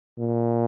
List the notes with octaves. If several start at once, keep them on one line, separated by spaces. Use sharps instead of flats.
A#2